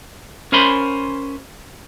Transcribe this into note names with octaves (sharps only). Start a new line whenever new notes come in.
C#4 A#4 C5 G#5 B5 C6